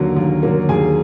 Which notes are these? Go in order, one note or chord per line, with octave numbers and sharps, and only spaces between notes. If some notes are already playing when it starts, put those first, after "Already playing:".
Already playing: D#2 D3 F#3 A#3 A#4
D#2
D3 F#3 A#3
D#2 G#4 G#5